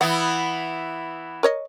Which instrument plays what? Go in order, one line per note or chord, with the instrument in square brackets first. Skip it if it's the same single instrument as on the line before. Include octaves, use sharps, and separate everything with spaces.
[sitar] E3 B3 E4 [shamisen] F#5
[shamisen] A#4 C#5 D#5